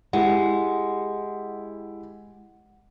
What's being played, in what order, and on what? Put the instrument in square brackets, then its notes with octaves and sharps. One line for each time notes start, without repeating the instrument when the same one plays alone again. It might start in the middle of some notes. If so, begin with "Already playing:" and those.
[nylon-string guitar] G#3 [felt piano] E4 G4 [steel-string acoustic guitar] F#5